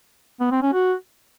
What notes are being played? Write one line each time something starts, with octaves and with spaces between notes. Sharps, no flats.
B3
C4
C#4
F#4